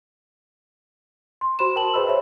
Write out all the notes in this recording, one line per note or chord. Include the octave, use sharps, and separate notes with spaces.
C6
F#4 C5 B5 C6 E7
A#4 G5 A5 F#7
G#4 B4 C5 D#5 B5 E6
C5 C#5 D#5 E5 B5